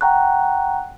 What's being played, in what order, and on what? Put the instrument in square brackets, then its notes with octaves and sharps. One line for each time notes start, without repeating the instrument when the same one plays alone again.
[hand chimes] F#5 G5 A#5 C#6 F#6